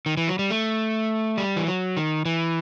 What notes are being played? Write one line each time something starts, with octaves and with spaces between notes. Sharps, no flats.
D#3
E3
F#3
G3
A3
G3
E3
F#3
D#3
E3